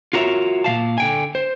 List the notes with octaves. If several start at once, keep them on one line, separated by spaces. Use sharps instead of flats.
F4 F#4 A#4 C#5 E5
A#2 E3 F5 A5
D3 G5 G#5
C5